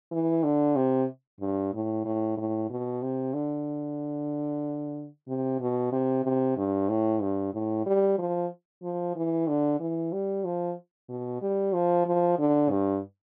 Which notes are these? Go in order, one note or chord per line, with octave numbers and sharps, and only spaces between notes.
E3
D3
C3
G2
A2
A2
A2
B2
C3
D3
C3
B2
C3
C3
G2
A2
G2
A2
G3
F3
F3
E3
D3
E3
G3
F3
B2
G3
F3
F3
D3
G2